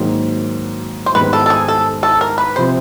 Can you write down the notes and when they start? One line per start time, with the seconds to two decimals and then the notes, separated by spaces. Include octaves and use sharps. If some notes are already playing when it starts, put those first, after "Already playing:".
Already playing: G#2 D#3 F#3 A#3
1.06 C5
1.15 G#2 D#3 G3 B3 B4
1.33 A4
1.46 A4
1.50 G#4
1.68 A4
2.03 A4
2.21 A#4
2.38 B4
2.56 C3 F3 C5